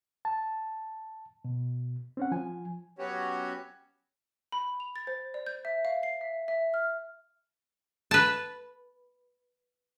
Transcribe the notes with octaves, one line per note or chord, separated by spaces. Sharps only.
A5
B2
C4 C#4 F#5
F3 G#5
F#3 B3 C#4 F#4 G4 C#5
B5
F7
A6
C5
D5
G6
E5
F5
C7
E5
E5
F6
B4 A5